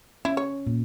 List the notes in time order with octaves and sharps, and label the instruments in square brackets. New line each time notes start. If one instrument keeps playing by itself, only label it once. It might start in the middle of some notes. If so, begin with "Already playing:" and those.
[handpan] C#4 [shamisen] E4
[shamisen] C#5
[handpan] A#2